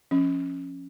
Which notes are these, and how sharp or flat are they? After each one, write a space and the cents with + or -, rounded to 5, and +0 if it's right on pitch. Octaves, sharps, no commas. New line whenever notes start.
F3 +0 C#4 -10